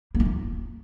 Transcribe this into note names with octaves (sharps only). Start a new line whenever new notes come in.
A#3
D#4
F4